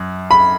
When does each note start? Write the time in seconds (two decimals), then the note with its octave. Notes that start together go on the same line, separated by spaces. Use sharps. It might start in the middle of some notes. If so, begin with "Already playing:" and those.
Already playing: F#2
0.31 B5